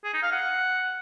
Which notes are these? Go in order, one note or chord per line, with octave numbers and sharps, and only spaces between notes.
G#4
D#4
F5
F#5